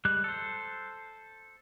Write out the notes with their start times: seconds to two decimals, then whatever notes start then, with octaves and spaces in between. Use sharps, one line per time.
0.05 G3 G#3 F#6
0.24 A4 C5